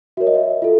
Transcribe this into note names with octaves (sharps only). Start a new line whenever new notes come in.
F#4 A#4 C#5 E5
D#5
E5
F4 A4